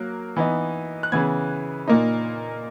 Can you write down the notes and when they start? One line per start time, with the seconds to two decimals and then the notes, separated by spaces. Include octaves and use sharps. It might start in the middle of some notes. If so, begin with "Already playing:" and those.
Already playing: F#3 A#3 F#6
0.36 E3 B3 D#4
1.03 F#6
1.12 C#3 E3 B3 G#6
1.88 A#2 A#3 D#4